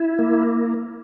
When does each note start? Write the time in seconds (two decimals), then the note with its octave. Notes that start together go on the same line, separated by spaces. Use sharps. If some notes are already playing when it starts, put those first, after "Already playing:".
Already playing: E4
0.19 A#3